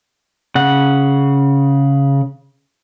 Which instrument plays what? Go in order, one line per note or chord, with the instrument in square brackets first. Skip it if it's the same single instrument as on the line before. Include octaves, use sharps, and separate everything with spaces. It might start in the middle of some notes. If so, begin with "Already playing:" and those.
[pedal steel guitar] C#3 F#5